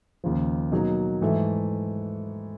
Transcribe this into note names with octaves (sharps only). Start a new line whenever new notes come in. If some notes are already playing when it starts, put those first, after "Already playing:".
D#2 C#3 F3
B2 F#3 A#3 D#4 G#4
G#2 E3 A3